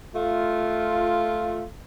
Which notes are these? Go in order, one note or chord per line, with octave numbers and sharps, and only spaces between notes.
A3 F4